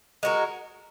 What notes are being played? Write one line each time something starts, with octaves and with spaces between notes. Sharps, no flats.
G#3 F#4 A#4